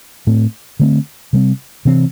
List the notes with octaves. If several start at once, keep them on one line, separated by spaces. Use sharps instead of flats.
A2 A3 C4
D3 A3 C4
C3 G3 C4
C3 E3 C4